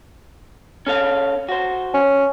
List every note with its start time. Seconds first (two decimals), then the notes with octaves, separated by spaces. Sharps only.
0.87 C#4 A4 F5
1.49 F#4 C5
1.95 C#4